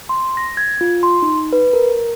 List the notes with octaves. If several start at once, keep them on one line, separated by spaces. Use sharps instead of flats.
C6
A#6
G#6
F4
C6
D#4
B4
A#4